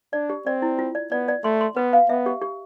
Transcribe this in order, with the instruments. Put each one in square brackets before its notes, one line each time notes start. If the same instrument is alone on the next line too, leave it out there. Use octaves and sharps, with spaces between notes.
[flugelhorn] D4 [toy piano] D5
[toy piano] G4
[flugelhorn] C4 [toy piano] D5
[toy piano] E4
F4
D5
[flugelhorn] B3 [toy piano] D5
[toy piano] D5
[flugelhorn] A3 [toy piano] C6
[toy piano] C6
[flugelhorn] B3 [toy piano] B4
[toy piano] F5
[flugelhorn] B3 [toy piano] E5
[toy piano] G4
G4